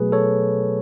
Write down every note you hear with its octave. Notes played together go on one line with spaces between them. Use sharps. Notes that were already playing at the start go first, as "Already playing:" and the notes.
Already playing: B2 F#3 A3 G#4 B4
A4 C#5